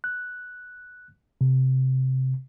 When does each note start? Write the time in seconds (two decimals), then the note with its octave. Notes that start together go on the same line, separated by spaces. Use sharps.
0.04 F#6
1.41 C3